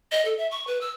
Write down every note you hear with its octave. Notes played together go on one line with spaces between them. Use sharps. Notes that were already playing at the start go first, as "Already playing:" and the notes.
D#5
A4
E5
C#6
B4
E6